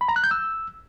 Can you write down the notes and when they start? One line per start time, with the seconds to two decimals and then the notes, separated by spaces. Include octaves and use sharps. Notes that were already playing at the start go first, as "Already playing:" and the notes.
0.01 B5
0.08 A#5
0.16 F#6
0.24 G6
0.31 E6